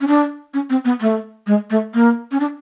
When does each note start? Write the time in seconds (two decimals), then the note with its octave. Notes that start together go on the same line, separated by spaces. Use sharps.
0.01 C#4
0.08 D4
0.54 C#4
0.70 C4
0.85 B3
1.01 A3
1.47 G#3
1.70 A3
1.94 A#3
2.31 C#4
2.40 D4